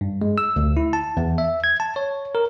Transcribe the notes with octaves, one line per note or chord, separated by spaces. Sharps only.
G2
G#3
E6
D2
E4
A5
E2
E5
G#6
A5
C#5
A#4